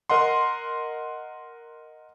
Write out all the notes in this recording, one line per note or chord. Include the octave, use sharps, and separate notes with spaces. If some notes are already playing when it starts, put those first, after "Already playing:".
A#4 D#5 F#5 C6